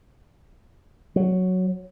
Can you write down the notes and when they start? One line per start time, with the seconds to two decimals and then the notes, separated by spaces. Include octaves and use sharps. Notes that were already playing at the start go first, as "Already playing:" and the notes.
1.16 F#3